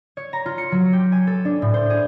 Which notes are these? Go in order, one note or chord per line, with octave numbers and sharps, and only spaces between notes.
C#5
A#5
F4
C#7
F#3
G4
G#5
A4
D4
A2
C5
G#4